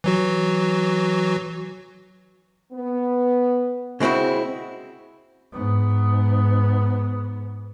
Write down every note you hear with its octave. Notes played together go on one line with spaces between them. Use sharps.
E3 F#3 F#4
B3
C#3 G#3 C4 E4 F#4
G#2 B3